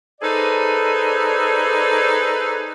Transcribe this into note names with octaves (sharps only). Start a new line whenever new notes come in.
D#4 G#4 A4 B4 C5 D5